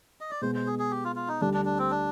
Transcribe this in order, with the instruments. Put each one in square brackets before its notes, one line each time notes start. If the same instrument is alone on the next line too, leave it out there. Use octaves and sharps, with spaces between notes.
[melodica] D#5
D5
[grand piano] B2 G#3 B3 [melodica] C5
[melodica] C5
G#4
G#4
G4
F4
F4
D#4
[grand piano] D2 D3 G3 [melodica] D4
[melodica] D4
D4
C4
D4